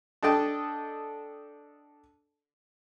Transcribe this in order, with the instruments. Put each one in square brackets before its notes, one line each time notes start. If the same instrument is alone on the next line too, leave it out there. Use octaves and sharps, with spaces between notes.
[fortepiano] D4 A4 D#5 G5 A5